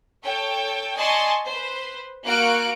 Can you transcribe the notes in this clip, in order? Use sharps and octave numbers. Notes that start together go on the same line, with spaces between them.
A4 C#5 G5
D5 D#5 G#5 A5 C6 C#6
B4 C5
A#3 F#4 F6 F#6 C#7 D7